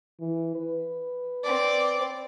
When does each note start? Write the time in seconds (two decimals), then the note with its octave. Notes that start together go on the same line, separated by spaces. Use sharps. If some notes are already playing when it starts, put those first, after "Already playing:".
0.20 E3
0.55 B4
1.44 C4 D5